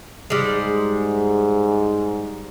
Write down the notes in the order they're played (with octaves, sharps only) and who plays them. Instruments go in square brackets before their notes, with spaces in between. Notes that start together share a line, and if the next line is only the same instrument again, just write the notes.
[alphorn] G#2 [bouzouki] G3 G#3